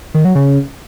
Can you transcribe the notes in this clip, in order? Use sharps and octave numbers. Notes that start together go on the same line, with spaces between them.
D#3
F#3
C#3